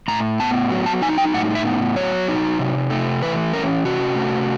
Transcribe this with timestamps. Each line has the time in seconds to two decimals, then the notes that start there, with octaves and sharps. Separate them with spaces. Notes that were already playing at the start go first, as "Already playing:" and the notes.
0.08 A2 A#5
0.40 B3 A5
0.70 F#3
0.86 A5
1.02 D#4 G#5
1.18 G5
1.34 A2 F#5
1.55 E5
1.65 B3
1.96 F#3 C#5
2.28 D#4
2.59 C3
2.90 A3
3.22 E3 B4
3.53 C#4 A#4
3.84 C3 F#4
4.16 A3